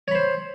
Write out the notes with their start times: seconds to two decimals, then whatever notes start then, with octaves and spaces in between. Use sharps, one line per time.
0.08 C#5
0.11 B5
0.15 C5